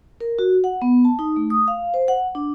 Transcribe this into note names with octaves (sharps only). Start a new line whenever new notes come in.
A#4
F#4
F#5
B3
A5
D#4
A3
D#6
F5
C5
F#5
D4